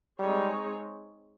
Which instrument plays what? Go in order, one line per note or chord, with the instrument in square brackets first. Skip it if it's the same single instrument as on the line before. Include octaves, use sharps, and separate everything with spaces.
[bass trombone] G3 [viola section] G#3 C4 D#4 G#4 C#5